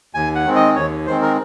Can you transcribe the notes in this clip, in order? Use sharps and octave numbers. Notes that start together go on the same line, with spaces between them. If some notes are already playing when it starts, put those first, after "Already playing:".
D#2 G#5
F#5
D#3 G#3 C4
D#5
D#2 C#5
D#3 G#3 C4 C5
A#4